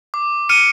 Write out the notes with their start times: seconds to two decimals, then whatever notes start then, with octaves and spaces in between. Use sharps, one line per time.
0.14 D6
0.49 F6 C#7 D#7